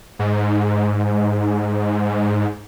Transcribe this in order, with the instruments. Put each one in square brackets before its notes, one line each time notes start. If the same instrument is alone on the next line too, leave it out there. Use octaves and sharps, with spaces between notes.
[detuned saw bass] G#2